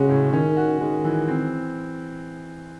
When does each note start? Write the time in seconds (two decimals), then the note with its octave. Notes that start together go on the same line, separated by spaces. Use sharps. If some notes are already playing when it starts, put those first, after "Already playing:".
Already playing: C#3 G#3 C#4 F#4
0.09 A2
0.33 D#3 C#4
0.57 F#4
0.80 D#3 G#3
1.04 E3
1.28 C4